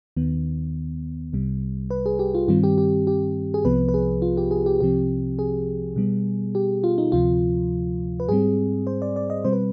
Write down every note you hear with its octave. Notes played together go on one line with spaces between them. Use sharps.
D#2 D#3 B3
C2 C3 G3
B4
G#4
G4
F4
G2 D#3 G3 C4 F4
G4
G4
G4
G#4
C2 C3 F3 B3 B4
B4
G#4
F4
G4
G#4
G4
C2 C3 F3 C4 G4
G#4
B2 G3 B3
G4
F4
D#4
D2 C3 F3 F4
B4
G#2 G3 C4 G#4
C5
D5
D5
D#5
B2 G3 C4 C5
B4